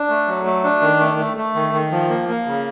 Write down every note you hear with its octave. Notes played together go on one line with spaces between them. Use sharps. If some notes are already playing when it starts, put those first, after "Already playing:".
Already playing: D4
A3
F#3
A3
D4
D#3
A3
A3
A3
D#3
D#3
F3
A#3
A#3
C#3